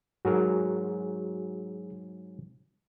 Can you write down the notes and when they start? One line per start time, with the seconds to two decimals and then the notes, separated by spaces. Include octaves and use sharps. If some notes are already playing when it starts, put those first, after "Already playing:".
0.25 G#2 F#3 F#4 G#4 A#4